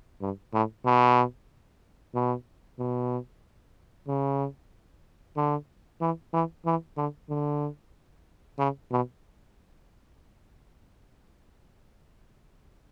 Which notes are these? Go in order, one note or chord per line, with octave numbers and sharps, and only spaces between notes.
G2
A2
B2
B2
B2
C#3
D3
E3
E3
E3
D3
D3
C#3
B2